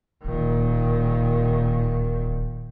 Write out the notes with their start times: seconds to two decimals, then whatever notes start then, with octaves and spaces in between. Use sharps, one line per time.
0.25 D1 A#2 D#3